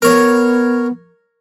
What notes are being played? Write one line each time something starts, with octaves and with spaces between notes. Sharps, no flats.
B3 A#4 C#5